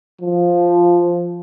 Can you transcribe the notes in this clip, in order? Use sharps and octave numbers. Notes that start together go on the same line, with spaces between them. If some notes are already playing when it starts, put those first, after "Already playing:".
F3